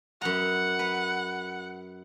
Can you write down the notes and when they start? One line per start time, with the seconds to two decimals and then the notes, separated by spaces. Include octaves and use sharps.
0.21 F#2 B3 F#5 A#5
0.79 B4 A#5